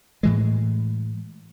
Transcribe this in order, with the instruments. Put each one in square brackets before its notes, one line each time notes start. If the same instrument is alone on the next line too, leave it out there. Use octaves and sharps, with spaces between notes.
[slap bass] A2 E3 G#3